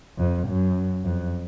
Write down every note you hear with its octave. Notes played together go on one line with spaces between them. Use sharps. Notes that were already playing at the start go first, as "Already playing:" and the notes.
F2
F#2
F2